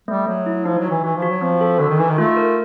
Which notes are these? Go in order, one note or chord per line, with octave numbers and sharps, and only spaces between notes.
G3 A3
F#3 A3
E4
F3 D#4
F#3
F#4
E3
E3 F#4
F3
F#4
F#3
F3 C4
A4
D3 F#4
D#3
E3 D#4
D#3
A3 F4
A#4